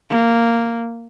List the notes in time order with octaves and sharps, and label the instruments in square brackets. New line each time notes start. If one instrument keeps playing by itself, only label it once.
[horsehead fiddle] A#3